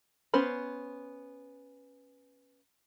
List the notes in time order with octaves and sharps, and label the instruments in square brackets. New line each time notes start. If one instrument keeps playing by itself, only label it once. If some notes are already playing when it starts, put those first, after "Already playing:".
[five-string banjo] B3 C#4 C5 B5